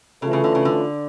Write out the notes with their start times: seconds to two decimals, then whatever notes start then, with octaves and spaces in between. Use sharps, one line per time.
0.21 C#3 E3 A3 C#4 F4 A4
0.33 C#3
0.44 D3
0.55 C#3
0.65 D3